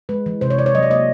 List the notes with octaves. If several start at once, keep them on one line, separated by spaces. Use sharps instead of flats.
G#3 B4
E3
C3 C5
C#5
C3 D5
C#5
F#3 D#5
D5
A#3 D#5